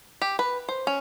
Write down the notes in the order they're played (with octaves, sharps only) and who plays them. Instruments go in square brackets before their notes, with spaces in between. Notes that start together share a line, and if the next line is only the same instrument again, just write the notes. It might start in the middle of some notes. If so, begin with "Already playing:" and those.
[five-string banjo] G4
B4
C5
C#4